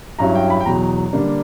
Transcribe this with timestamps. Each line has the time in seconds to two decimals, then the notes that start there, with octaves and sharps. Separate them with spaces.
0.19 G2 F#3 C#4 E4 A#5
0.35 G5
0.50 B5
0.61 G5
0.65 E2 B2 F#3 A#5
1.13 D3 G3 A#3 D4